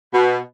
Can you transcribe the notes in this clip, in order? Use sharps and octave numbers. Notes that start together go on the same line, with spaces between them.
B2